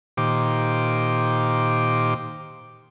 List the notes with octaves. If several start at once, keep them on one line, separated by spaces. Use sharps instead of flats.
A#2 D#3 G4 C5 D6